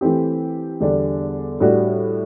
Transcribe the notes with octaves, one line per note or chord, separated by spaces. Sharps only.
E3 A3 C4 G4
E2 D3 G3 D4
A2 G3 D4 F#4